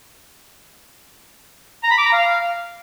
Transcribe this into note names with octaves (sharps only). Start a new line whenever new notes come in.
A#5
B5
D6
A#5
F5